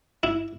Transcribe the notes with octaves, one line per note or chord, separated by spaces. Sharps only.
E4